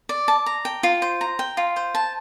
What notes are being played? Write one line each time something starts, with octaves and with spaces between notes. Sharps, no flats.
D5
A5
A#5
G5
F4
C5
A#5
G5
F4
C5
A5